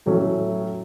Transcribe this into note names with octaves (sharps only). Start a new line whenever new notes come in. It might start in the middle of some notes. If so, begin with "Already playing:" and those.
A2 F#3 A3 C#4